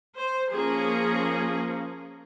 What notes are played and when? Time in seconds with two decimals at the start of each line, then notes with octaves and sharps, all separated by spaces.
0.17 C5
0.54 F3 A#3 C#4 G#4